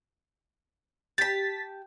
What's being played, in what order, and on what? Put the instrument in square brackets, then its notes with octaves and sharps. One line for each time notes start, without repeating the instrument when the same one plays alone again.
[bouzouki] G4 A5 [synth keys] A6 B6